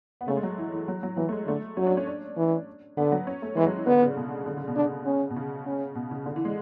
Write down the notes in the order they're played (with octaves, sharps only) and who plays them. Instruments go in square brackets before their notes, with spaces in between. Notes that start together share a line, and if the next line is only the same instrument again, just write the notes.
[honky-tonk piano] B3
[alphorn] C#3 [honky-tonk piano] A3
[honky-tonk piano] G#3
F#3
E3
E3
F#3
F#3
[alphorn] E3 [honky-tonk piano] F#3
[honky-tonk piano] A3
G#3
[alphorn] D3 [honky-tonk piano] A3
[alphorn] F#3 [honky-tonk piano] C#4
[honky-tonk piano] D4
C#4
D4
[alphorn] E3
[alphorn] D3 [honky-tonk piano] B3
[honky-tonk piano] F#3
C#4
A3
[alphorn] E3 [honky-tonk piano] G#3
[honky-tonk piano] F#3
E3
[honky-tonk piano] D3 [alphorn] B3
[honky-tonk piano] C#3
B2
D3
C#3
B2
[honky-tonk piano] C#3 [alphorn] D4
[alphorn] C#4
[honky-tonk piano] B2
C#3
[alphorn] C#4
[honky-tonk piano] B2
C#3
D3
E3
G#3